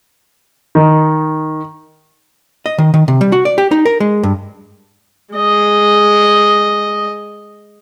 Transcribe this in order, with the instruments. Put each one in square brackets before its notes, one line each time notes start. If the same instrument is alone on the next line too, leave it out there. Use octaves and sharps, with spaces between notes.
[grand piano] D#3
[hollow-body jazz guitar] D#5
D#3
D#3
C3
G3
F#4
D5
G4
D#4
A#4
G#3
G2
[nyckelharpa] G#3 D#5